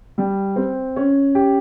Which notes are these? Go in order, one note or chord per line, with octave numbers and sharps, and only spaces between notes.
G3
C4
C#4
G4